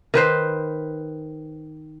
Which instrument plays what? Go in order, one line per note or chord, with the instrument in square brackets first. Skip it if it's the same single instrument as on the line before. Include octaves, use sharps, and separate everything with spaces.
[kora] D#3 B4 C5